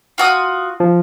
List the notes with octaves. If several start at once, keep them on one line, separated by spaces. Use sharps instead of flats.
F4 F#4 D#6
F3